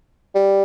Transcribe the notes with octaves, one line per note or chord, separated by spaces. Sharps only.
G3